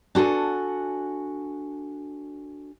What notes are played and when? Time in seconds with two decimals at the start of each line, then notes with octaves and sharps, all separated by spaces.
0.15 D4 F#4 A4 G#5